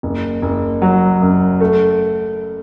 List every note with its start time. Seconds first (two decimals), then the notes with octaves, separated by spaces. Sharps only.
0.03 F#1
0.42 F#1
0.82 F#3
1.22 F#2
1.60 A3